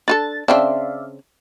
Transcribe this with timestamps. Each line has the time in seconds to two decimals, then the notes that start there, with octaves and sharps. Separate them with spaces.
0.08 D4 F4 A4 A6
0.48 C#3 C4 D4 D5 E5 F5